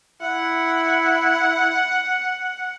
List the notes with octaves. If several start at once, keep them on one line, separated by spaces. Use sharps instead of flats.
E4 F#5